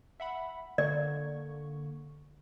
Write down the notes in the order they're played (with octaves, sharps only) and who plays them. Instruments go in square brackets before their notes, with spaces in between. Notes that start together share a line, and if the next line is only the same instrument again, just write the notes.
[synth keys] E5 F#5 B5
[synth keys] D3 A#3 C#6 [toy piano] D5